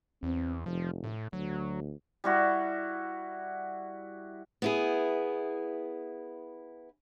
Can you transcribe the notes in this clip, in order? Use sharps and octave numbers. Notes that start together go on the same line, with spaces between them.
E2 C4
F1 F3
A2
D2 F#3
G3 E4 F#4
B3 E4 G#4